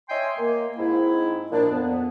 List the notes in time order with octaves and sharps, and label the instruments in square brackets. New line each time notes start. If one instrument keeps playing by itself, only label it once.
[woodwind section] C#5 D#5 E5 G5 G#5 C6
A#3
G#2 C4 D#4 E4
A#2 F3 D4
F2 B3